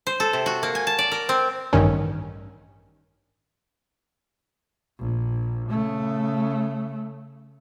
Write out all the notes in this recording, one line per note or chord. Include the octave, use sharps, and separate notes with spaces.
C5
A4
C3
F#4
A#3
G#5
A5
D5
A#4
C4
A1 G2 D#3 C#4
A#1
C#3 A3